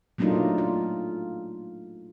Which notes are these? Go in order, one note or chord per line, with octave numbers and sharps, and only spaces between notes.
F#3 A3 A#3 D4 D#4 F4
F4